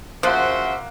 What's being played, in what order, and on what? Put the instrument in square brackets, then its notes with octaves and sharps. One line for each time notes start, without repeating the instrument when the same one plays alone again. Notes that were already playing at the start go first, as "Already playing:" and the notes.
[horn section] C#3 F#4 C5 [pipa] F3 [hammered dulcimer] A#3 F#5 [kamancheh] E5